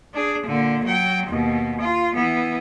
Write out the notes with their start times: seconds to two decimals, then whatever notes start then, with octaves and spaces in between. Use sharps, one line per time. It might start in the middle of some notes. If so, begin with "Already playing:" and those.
0.14 D4 G#4
0.46 A#2 D3
0.84 F#3 G5
1.26 D#2 B2
1.81 F4
2.14 E3 B3